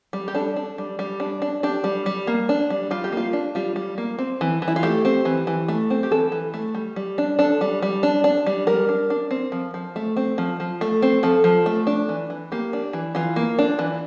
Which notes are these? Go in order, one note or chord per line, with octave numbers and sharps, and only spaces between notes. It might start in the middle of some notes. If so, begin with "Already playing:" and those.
G3
G4
D4 A4
D4
G3
G3
D4
D4
D4 G4
G3
G3
A#3
D4
G3
G3 F4
G4
A#3 F4
D4
G3 F4
G3
A#3
C4
E3
E3
E4
F4
A3 G4
C4
E3
E3
A3
C4
G4
E3 A4
E3
A3
G3
G3
D4
D4 A4
G3
G3
D4
D4
G3
G3 A#4
D4
D4
C4
F3
F3
A3
C4
F3
F3
A3
C4
F3 A4
F3
A3
D4
E3
E3
A#3 G4
D4
E3
E3 F4
A#3
D4
E3